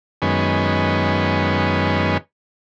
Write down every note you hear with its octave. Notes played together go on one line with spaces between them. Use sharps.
F#2 D#3 G#3 B3 C#4